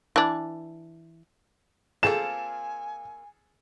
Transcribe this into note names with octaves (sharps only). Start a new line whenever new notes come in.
E3 D4
A#3 C4 F4 G#4 A4 G#5 E7